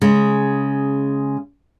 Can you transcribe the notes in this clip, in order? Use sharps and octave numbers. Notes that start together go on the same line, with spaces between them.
C#3 G#3